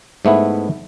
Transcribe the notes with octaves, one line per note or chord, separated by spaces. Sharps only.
G#2 A3 B3 E4